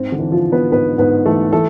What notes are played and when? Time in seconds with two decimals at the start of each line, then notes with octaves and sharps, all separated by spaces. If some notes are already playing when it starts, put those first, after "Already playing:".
Already playing: G#2 C4
0.12 D3 D4
0.18 E3
0.31 F3 F4
0.46 E3
0.52 B3 B4
0.72 G#2 B3 B4
0.98 G#2 B3 B4
1.25 E3 A3 A4
1.53 E3 A3 A4